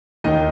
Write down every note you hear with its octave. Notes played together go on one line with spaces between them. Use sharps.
D#2 D#3 D#4 D#5